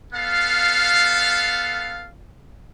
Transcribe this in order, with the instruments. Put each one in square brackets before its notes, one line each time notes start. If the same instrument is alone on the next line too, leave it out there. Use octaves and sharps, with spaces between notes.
[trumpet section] B3 A4 F5